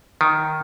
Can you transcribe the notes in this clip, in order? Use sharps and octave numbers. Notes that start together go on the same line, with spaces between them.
D#3